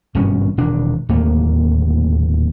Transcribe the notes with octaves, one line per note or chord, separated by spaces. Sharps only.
G#1 G2 B2 C#4
E1 D#3 D4
D1 D#2 A3 A#3